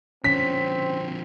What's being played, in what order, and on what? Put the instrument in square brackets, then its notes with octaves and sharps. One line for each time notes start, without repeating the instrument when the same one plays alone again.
[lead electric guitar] D3 F3 [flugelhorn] C4 [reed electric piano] C#4 [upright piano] B6